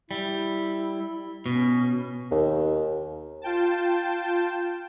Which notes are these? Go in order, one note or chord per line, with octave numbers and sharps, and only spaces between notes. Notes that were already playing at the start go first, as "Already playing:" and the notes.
G3 E4
B2 C#4
D#2
F4 G5 A5